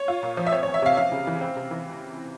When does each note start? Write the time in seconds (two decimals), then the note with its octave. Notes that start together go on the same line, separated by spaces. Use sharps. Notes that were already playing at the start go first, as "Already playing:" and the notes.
Already playing: C#5
0.08 F4
0.23 A#2
0.37 F3
0.47 E5
0.52 C4 C#5
0.63 C#5
0.67 E2
0.74 E5
0.82 C3 F5
0.97 C#4 F5
1.12 C#3
1.27 E3
1.41 C4
1.56 C3
1.71 E3